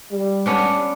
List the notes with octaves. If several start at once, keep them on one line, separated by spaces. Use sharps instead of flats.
G3
B3 C#4 D4